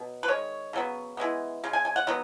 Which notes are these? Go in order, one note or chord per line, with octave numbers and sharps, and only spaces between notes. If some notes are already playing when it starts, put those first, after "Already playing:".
Already playing: B2 F#3
B4
D#3 G#3 C#5
C#3 F#3 B3
E3 G#3 B3
C#3 G#3
G#5
G#5
F#5
D#3 F#3 B3